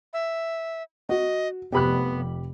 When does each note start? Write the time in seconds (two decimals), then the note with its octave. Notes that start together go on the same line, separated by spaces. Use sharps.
0.13 E5
1.09 F#4 D#5
1.72 F1 F2 B3 G4 B5 F#6